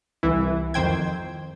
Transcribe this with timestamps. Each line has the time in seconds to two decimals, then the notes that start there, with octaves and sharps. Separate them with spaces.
0.23 C2 E3 E4
0.74 F2 D#3 C5 G5 G#6